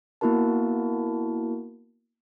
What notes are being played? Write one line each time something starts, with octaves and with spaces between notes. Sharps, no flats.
A#3 B3 E4 F#4 A#4 A5